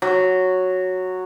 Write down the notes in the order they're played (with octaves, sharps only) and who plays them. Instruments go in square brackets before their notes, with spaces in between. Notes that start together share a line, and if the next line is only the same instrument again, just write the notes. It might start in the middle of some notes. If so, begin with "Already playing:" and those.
[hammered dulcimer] F#3